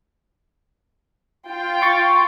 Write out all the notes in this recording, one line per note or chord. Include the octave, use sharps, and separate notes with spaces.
F4 G5
C6 C#6 A6